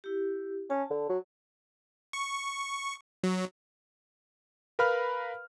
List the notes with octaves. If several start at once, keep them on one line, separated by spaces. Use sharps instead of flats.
E4 G4
C#4 A5
D3
F#3
C#6
F#3
A#4 B4 F5 B5 F6